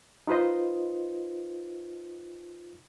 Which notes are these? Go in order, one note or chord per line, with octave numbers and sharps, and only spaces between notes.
D#4 F4 B4 C5 D#5